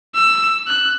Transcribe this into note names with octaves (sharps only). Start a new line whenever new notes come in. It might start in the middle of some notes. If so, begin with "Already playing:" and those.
E6
F#6